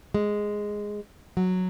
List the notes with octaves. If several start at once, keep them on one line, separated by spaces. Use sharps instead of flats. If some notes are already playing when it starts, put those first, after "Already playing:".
G#3
F#3